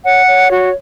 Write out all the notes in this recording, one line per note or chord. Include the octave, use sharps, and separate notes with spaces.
C#5 F#5
C#5
F#4